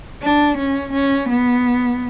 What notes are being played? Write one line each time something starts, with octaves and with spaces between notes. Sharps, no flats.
D4
C#4
C#4
B3